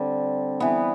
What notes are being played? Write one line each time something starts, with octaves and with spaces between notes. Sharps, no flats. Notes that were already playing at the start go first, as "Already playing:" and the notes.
Already playing: D3 G3 C4
E3 B3